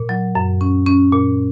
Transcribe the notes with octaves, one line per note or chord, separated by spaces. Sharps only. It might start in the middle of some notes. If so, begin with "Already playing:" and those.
Already playing: A#2
F#3
F#2
C#4
C#4
A#2